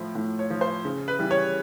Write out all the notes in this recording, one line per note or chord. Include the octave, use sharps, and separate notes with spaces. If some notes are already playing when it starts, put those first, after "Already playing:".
Already playing: A2 F3
A2
C#5
F3
C5
C#3
B4
E3 G3
C#5